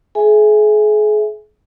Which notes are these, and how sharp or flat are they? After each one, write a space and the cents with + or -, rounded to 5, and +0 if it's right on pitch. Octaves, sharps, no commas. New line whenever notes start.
G#4 +35 E5 +0 G#5 +0